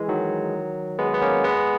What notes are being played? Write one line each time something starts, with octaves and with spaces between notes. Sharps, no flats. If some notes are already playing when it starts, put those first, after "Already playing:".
Already playing: E3 G#3
D#3 F#3
G#3 B3
B3
A#3 C#4
G#3 B3